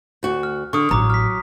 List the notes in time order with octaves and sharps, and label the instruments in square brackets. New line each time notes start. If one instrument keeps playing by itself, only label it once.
[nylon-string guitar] D2 F#4
[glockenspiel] F6
[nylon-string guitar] D3 [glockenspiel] C#6 D#6 F6
[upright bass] A1 [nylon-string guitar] F#3 [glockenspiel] A#5 D6
[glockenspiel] F6 B6